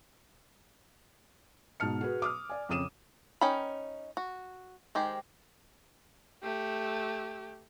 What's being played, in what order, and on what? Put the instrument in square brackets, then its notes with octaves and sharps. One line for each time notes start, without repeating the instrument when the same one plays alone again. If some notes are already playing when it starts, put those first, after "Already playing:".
[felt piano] G#2 B2 A5 F6 C#7
F#4 G#4 B4
D6 D#6 F6
D5 G#5
F2 C#3 D#6 D#7 E7
[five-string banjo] C#4 D#4 A#4 G5 B5
F#4
D#3 G#3 G4 C5
[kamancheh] A3 G4